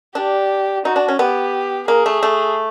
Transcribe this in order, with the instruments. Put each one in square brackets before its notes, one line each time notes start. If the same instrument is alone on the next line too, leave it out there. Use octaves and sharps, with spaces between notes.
[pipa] D4 [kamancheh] G4
[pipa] D#4 [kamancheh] F#4
[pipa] D4
C#4
[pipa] B3 [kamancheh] G4
[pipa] A#3 [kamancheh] G#4
[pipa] A3
A3